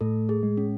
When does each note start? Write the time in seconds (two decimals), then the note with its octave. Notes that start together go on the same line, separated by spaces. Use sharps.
0.01 A2 A3 A4
0.29 G#4
0.43 G#3
0.57 C#4